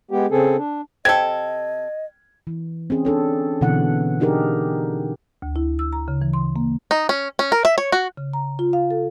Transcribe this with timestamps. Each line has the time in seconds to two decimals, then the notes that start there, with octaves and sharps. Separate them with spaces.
0.11 G#3 B3 G4
0.31 C#3 C4 G#4 A4
0.57 D4
1.05 C3 A4 D#5 G5 G#6
2.47 E3
2.90 C4 C#4 G#4
3.05 D4 A4 C#5
3.61 B2 D3 E3 C4 F#5
4.20 D4 D#4 G4 G#4 A#4
5.42 D2
5.56 E4
5.79 E6
5.93 A#5
6.08 C#3
6.22 E3
6.34 C6
6.56 A#3
6.91 D#4
7.09 C#4
7.39 C#4
7.52 A#4
7.65 E5
7.78 C#5
7.92 F#4
8.17 C#3
8.33 A#5
8.59 F4
8.73 F5
8.91 A4